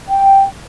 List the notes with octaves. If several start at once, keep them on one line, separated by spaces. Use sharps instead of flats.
G5